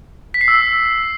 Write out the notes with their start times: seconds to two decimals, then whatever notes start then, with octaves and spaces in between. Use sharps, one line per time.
0.34 B6
0.41 C7
0.48 E6